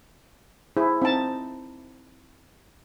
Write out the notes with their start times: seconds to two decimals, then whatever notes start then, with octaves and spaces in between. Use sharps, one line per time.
0.77 E4 G#4 C5
1.02 C4 D#4 A5